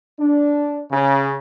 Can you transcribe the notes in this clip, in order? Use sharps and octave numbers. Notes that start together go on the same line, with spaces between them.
D4
C#3